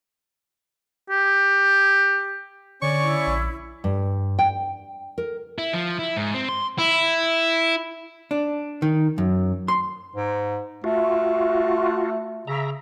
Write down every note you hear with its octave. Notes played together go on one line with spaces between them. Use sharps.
G4
D3 C#4 C#5 D5 C#6
E4
A#1
G2
G5
A#4
E4
F3
E4
G#2
C4
C6
E4
D4
D#3
F#2
C6
G#2
A3 F4 F#4
C#3 E5 A#5